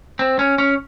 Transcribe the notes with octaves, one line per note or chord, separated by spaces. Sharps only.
C4
C#4
C#4